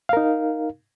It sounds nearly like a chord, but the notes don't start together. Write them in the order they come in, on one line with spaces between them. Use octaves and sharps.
F5 A#4 D#4